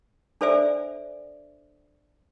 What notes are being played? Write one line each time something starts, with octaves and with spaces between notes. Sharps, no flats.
D4 A4 C5 D5 E5 G#5